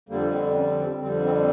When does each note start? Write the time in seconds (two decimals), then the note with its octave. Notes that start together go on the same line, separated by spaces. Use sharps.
0.09 F2 D3 G3 A#3
0.32 C4
0.55 C#4
0.78 C4
1.00 F2 D3 G3 C4
1.24 C4